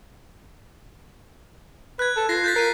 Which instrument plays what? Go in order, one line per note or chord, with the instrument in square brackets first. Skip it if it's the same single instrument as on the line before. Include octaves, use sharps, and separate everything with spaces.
[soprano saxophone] B4 [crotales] F#6 G#6
[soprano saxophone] A4
[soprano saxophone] F4 [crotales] A#6 C7
[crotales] G6 A6 B6
[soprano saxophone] A#4 [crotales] C7 D#7